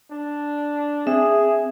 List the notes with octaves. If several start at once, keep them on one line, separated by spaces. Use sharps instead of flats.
D4
C4 G#4 E5